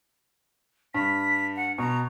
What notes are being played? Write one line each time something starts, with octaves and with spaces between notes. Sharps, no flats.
G2 B6
F#5
B2 A#5